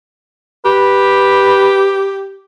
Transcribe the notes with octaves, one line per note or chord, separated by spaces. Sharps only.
G4 B4